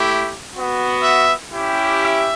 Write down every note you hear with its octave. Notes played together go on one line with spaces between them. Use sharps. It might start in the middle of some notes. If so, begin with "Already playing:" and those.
Already playing: A3 E4 G4
B3 F#4
E5
C#4 E4 G4
E5